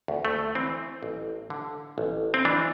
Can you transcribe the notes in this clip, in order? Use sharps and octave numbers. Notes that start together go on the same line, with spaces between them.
D2
A3
E3 C4
A1
D3
A1
C4
E3 D4